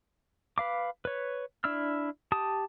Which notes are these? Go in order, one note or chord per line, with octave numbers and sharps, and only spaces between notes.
B4 F5 D6
B4 C#5
D4 E4 E6 F6
G4 A5 D#6